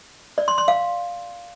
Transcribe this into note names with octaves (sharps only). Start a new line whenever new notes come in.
D5
C6
C6
F5